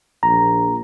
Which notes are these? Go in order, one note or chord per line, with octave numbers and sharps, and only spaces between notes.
A#1 A#5